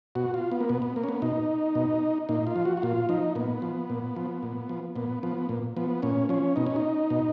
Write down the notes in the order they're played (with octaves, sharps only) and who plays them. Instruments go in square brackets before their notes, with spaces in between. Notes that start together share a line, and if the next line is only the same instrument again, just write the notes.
[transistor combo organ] B2 F#4
F4
B3
A#3
B2 B3
B3
A#3
C#4
B3
B2 D#4
B2
A#2 D#4
F4
F3
F#4
F#4
A#2 F4
F3 D#4
A#2 B3
F3
A#2
F3
A#2
F3
A#2 B3
F3 B3
A#2
F3 B3
A#2 C#4
F3 C#4
B2 D#4
C#4
D#4
B2